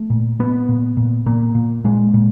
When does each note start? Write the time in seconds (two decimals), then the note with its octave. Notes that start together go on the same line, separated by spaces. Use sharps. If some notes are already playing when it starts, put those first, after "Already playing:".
Already playing: A3
0.10 A#2
0.39 A#2 B3
0.69 A#2
0.97 A#2
1.26 A#2 A#3
1.55 A#2
1.84 A#2 G#3
2.14 A#2